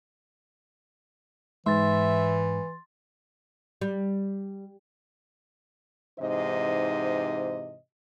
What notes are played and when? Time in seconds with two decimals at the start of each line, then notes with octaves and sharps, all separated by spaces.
1.66 G#2 E3 E5 C6 A6
3.81 G3
6.19 G#2 C3 E3 D#4 C5 D#5